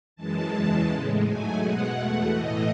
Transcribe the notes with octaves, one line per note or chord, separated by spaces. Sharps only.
F#2 E3 G#3 A5
E2 C#3 E3 G#3
A2 G#3
G#2 F#3 A3 G#5
B2 G#3 F#5
E2 B2 A3
A2 E3 A3 D#5